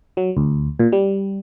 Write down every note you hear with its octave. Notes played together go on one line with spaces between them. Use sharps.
F#3
D2
A#2
G3